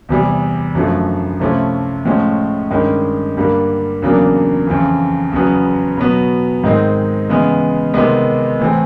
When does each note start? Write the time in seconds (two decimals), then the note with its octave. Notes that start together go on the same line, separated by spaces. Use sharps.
0.09 E2 C3 E3 G3
0.75 F#2 D3 F3 A3
1.40 C3 F3 A3 C#4 E4
2.05 A2 F3 G#3 C#4
2.71 G2 D#3 G#3 C#4
3.37 G2 D3 G3 A#3
4.02 E2 C#3 F#3 A#3 D4
4.67 F2 C#3 E3
5.32 E2 C#3 F#3 B3
5.97 B2 F#3 B3
6.64 G#2 D#3 G#3 C4 D#4
7.29 C#3 E3 G#3 B3
7.94 C3 D#3 G#3 B3
8.60 A2 E3 A3 C4